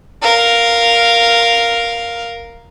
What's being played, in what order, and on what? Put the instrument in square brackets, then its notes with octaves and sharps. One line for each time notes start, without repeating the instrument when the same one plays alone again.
[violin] A#4 F5